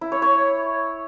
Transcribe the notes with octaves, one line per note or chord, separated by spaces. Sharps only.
E4
C#5
C#5